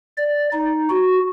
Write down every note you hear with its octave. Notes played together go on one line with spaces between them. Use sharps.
D5
D#4
F#4